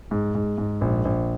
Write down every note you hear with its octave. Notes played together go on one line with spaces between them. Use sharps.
G#2
G#2
G#2
A#1
A#1